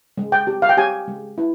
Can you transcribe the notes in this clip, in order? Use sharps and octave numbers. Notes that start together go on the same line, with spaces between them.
G#3
G5
G4
F5
G5
G4 G#5
G#3
E4